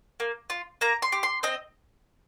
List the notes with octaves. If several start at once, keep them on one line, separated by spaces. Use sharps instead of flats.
A#3
F4
A#3 A#5
C6
G4
C6
C4 D#5